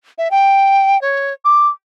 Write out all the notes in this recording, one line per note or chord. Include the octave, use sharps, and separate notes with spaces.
E5
G5
C#5
D6